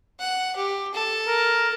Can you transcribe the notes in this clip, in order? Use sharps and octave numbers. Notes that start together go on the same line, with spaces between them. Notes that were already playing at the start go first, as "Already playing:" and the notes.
F#5
G4
A4
A#4